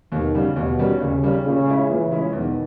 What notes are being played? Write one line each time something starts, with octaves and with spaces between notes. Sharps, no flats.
D#2 B2 D#3
C#3 G3
D#2 B2
D#3 G3 C#4
D#2 C#3
D#3 G3 C#4
A#2 C#3
G#3 C#4 E4
A#2 C#3 E3
G#3 C#4 E4
E2 B2 D#3